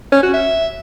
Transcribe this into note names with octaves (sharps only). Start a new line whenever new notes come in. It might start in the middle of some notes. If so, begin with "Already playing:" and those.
C#4
F#4
E5